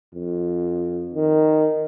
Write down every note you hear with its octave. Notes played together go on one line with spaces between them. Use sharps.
F2
D#3